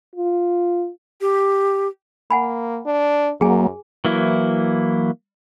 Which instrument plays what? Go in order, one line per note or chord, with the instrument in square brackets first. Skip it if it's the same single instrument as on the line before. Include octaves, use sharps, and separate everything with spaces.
[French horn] F4
[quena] G4
[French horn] A#3 [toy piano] F#5 G#5 B5
[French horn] D4
[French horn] F#2 [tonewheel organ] F#3 A#3 [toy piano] G#4 G#5
[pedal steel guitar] E3 F#3 A#3 E4